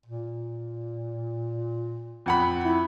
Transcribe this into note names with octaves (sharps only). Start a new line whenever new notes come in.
A#2
F2 F#5 B5
E4